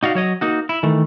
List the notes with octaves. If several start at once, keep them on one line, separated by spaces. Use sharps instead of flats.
D#4 F#4 D5 F5
F#3 C#5 D#5
A#3 D#4 F#4
E4
D#3 E3 A3